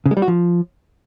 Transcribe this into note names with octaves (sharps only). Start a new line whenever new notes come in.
C#3
G#3
G3
F#4
F3